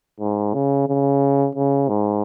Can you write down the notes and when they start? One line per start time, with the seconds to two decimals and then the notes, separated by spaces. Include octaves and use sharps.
0.20 G#2
0.54 C#3
0.88 C#3
1.55 C#3
1.89 G#2